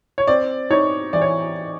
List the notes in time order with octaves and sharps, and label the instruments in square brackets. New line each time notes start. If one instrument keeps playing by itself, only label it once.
[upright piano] C#5
C4 D5
D#4 C#5
E3 D5
C#5